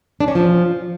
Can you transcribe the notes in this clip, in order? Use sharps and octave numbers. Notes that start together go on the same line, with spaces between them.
D4
C#4
F3